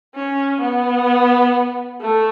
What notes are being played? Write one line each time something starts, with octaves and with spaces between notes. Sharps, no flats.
C#4
B3
A3